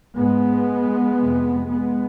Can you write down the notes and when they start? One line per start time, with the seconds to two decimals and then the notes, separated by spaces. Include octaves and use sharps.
0.16 G#2 G#3 B3
1.18 F2 C3
1.68 G#3 B3